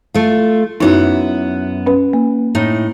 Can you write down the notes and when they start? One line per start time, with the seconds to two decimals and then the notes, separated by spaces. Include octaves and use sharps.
0.14 A3 F4
0.80 F#2 B3 D#4 E4 F#4 E5
1.86 C#4 B4
2.13 A#3
2.55 A2 D#4